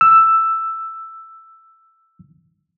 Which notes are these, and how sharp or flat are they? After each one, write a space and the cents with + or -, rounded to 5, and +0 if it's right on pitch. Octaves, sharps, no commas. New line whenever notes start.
E6 +5